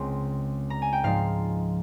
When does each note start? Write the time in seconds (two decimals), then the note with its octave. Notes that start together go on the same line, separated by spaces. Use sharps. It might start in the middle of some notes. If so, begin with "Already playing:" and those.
Already playing: C#2 C#3 G#3 C4
0.70 A#5
0.82 G#5
0.93 G5
1.04 G#2 F3 G#3 F5